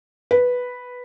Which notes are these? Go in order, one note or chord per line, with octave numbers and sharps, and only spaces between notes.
B4